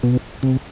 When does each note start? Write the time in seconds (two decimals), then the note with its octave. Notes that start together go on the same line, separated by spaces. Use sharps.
0.03 B2
0.43 C3